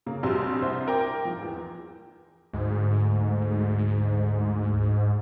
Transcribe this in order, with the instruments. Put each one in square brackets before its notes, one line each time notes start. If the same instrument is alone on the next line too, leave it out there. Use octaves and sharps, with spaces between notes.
[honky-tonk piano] C#3 A#3
A#1 F2 C3 G3 F#4 C6
C2 C5 E5
A#4 G5 D6
G#2 F3
E2
[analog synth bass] D2 [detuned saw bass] G#2